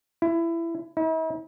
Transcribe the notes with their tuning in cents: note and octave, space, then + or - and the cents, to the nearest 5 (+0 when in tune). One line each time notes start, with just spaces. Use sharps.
E4 +20
E4 -45